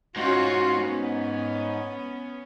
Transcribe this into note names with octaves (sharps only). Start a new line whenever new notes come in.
G#2 C#4 F4 F#4
B3 C#4